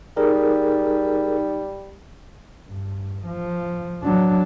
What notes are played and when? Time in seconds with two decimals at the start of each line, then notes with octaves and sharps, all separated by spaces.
0.17 G3 D#4 G#4 A#4
2.68 G2
3.27 F3
4.03 F#3 D4